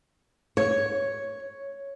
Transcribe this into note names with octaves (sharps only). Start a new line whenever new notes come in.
C#5